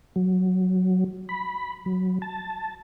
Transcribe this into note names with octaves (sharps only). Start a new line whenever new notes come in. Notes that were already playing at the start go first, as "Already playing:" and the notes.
F#3
B5
F#3
A5